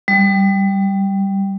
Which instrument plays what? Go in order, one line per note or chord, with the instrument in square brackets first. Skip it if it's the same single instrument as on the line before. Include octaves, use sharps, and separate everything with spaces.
[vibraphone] G3